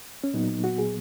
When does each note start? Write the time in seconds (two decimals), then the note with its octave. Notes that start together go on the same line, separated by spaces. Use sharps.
0.24 C#4
0.33 A#2 F#3 B3 D#4
0.64 F#4
0.78 G#4